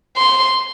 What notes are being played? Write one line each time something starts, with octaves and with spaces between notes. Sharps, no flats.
C6